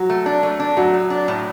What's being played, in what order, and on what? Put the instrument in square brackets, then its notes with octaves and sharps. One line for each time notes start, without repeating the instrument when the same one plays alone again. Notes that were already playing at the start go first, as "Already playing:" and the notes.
Already playing: [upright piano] F#3
[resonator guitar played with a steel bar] A3
D4
A3
D4
[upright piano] F#3 [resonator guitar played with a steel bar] A3
[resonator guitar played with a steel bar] A2
D4
A2